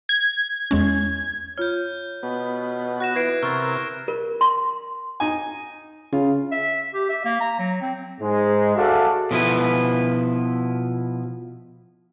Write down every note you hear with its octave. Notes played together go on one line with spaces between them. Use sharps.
G#6
E2 G#3 C#4
F4 C#5 F6 G6
B2 B3
F#4 F#6 A#6 E7
E3 B4 G#6 C7 D7
C3 E4 A#4 C#6 F6 A6
A#4
C6
D#4 G#5
C#3 F4
E5
G4
E5
A#3
A#5
F#3
C4
G#2 G#3
F#4 G#4 A4 D5 E5 F5
B2 F3 E4 B4